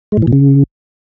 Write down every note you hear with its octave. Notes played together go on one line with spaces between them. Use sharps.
G#3
A2
E3
A#2
C#3